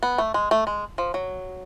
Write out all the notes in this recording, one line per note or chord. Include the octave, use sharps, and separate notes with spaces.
B3
A3
G#3
A3
G#3
F3
F#3